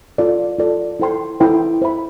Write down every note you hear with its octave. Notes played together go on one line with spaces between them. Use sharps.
F4 A4 D5
F4 A4 D5
E4 A4 C5 G5 C6
E4 A4 C5 G5 C6
C5 E5 B5